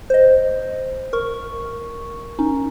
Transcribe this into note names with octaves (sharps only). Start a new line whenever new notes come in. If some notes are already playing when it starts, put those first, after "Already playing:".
C5 D#5
A#4 C#6
C#4 D#4